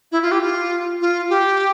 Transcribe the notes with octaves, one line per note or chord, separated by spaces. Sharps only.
E4
F4
G4
F4
F4
G4